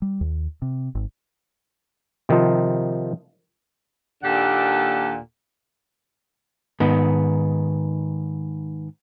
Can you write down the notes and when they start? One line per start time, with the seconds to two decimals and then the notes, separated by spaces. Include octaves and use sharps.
0.02 G3
0.21 D#2
0.62 C3
0.95 G#1
2.29 C3 D#3 F3 D#4 F4
4.24 D#2 A#2 D4 G4 A4 F#5
6.80 G#2 D#3 B3